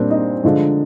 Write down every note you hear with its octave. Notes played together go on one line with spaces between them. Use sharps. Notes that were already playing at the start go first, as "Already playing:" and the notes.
Already playing: A#2 G3 C4 D4 C5 D5
D#4 D#5
D3 F3 G#3